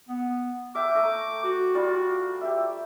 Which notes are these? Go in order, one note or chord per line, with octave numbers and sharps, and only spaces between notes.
B3
A#4 E5 G5 D6
A3 A#5 D#6
F#4
G3 F4 D5
G4 E5